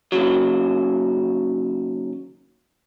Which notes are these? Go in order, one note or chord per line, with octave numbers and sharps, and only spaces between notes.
D#2 C#3 F#3